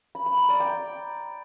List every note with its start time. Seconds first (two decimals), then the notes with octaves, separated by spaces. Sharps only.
0.15 B5
0.26 B5
0.37 A#5
0.49 D5
0.60 G5